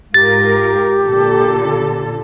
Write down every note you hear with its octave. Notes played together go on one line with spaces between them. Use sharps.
G#2 F4 G4 A#4 A6
A#2 D3 A4